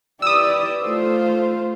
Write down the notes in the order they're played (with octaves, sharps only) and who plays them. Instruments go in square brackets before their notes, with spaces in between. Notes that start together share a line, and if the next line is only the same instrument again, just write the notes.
[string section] E4 G4 B4 [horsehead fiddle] D5 [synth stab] D#6 E6
[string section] A3 F4 [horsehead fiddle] C5